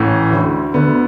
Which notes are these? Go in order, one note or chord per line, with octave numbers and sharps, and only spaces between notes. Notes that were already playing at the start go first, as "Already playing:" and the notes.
Already playing: A1 A2 E3 C#4
D2 D3
D2 D3 B3